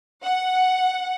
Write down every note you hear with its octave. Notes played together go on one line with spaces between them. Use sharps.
F#5